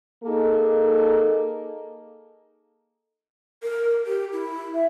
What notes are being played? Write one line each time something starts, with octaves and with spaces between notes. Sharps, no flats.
A#3 D#4 G#4 A4
A#4
G4
E4
E5